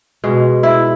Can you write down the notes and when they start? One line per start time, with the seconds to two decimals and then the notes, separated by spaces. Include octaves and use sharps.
0.24 B2 G#3
0.63 E4